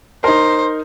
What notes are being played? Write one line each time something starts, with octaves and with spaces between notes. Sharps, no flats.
D#4 A#4 C5